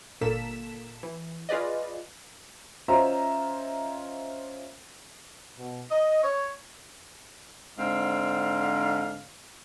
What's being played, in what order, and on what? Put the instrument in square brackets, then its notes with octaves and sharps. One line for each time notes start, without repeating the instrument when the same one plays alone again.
[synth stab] G1 A#2 A#3 A4 B6 E7
E3
F4 G#4 B4 D5 D#5
[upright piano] C#4 F4 C5 D#5 E5 A#5
[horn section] B2
D#5
C#5
[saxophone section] G#2 D3 C4 F5